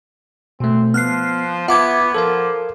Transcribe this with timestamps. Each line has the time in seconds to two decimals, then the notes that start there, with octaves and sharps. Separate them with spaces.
0.60 B2 A3 C4
0.94 F3 B3 F6 F#6 C7
1.68 B3 F4 E5 F#5 A5 D6 G#6
2.14 F3 A4 A#4 F5